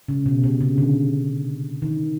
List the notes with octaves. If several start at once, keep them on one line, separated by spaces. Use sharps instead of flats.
C#3
B2
C3
C#3
D3
D#3